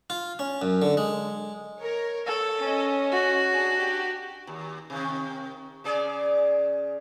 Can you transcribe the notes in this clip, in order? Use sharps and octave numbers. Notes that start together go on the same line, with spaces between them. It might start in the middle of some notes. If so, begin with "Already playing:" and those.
F4
C#4
F#2
D3
G#3
A#4 C#5
A4 C#5
C#4 D#5
F#4
D4 G#4 A5
G4
D#2
C3 D#3
C#3 G#4 D5